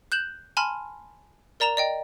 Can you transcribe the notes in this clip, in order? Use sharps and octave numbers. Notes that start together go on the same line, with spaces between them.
F#6 G6 E7 F#7
G#5 A5 B5 C6 F6
A#4 D5 A#5 E7 F7
D5 D#5 G5